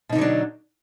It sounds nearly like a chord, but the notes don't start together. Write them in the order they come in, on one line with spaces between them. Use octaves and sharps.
B2 D#4 D3 F#3 D4